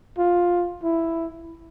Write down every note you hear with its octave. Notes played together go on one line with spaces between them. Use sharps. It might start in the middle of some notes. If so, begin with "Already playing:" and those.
F4
E4